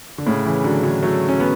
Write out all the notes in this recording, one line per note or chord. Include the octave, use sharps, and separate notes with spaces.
D3
A2 C#3
C#3 E3
D3 F#3
D3 F#3
F#3 A3
C#4
B3